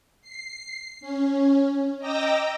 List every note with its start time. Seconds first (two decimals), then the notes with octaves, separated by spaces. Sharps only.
0.21 C7
1.01 C#4
1.99 D#5 G5 A#5 D6 E6 A#6